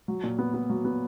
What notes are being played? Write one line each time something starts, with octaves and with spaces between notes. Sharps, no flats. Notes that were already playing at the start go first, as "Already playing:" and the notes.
F#3
A#2
B3
B3
F#3
B3